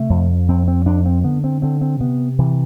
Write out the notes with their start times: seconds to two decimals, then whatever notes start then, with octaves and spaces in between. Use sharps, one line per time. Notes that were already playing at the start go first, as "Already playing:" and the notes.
Already playing: C3 A3
0.10 F2
0.49 F2 C4
0.68 C4
0.86 F2 D4
1.06 C4
1.24 D3 B3
1.44 C4
1.62 D3 C4
1.81 C4
2.00 C3 B3
2.39 C3 E3